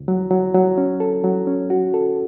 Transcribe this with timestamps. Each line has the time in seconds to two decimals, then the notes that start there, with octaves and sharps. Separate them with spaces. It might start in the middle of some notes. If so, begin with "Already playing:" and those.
Already playing: C#2
0.08 F#3
0.31 F#3
0.54 F#3
0.78 C#4
1.00 A4
1.24 F#3
1.47 C#4
1.70 F#4
1.94 A4